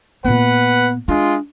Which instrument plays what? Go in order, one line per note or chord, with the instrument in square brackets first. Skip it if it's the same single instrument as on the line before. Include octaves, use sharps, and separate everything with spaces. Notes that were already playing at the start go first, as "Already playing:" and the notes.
[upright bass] A#2 B3 [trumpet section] B4 F#5
[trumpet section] G#3 F4 [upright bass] D4